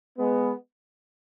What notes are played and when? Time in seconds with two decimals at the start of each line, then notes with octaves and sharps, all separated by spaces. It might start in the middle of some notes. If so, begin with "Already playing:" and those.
0.18 G#3 B3